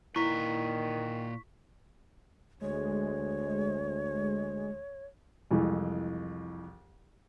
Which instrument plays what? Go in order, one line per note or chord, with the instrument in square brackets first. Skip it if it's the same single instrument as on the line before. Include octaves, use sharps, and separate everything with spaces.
[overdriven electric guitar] A#2 B4 [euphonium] D#3 [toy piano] E4 [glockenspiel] C#6 B6
[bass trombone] D2 [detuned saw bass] G#3 [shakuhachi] C#5
[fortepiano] C2 F2 E3 G#3